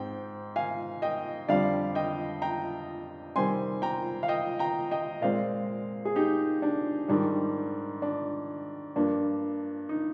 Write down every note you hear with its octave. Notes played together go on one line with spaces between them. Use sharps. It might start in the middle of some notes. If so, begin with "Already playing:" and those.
Already playing: G#2 C4 G5
F5 G#5
D#5 G5
F2 D3 G3 C4 D5 F5
D#5 G5
G5 A#5
C3 D#3 G3 C4 G#5 C6
G5 A#5
F5
D#5 G5
G5 A#5
D#5 G5
A#2 G#3 C4 D5 F5
G#4
D#4 G4
D4
G#2 D#3 G3 D4
D4
G2 F3 A#3 D4
D#4